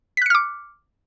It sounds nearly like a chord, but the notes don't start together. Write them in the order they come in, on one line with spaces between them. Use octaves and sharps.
B6 F#6 C#7 F6 D6